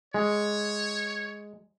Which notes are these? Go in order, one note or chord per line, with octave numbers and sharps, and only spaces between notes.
G#3 C#5